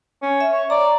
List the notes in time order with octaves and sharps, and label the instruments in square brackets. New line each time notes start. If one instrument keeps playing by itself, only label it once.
[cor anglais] C#4
[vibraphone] E5
[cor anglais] C#5
[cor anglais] D5 [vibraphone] A#5